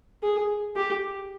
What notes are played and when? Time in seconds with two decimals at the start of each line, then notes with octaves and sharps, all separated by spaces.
0.23 G#4
0.76 G4